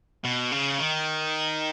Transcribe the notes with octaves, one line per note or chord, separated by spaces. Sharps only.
B2
C#3
D#3